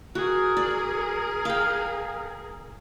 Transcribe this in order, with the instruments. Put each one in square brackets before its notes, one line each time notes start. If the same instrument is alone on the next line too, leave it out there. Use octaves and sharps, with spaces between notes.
[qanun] F#4 [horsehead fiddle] G#4 A#4
[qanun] D5
F5 G5